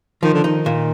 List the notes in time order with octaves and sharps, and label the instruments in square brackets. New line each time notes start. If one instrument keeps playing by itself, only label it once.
[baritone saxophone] D#3 [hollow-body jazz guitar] F3
[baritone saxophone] D3
[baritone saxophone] D#3 [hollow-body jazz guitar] D#4
[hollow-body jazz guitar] A#2